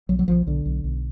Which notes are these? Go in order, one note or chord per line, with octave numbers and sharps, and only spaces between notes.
B1 F#3
F#3
B1 F3
B1 D3
B1
B1